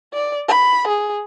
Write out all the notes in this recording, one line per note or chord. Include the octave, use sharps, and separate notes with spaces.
D5
B5
G#4